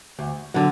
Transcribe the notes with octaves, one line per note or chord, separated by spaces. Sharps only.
D2
D3 F#3